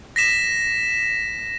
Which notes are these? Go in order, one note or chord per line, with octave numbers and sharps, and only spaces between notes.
A#6 B6 E7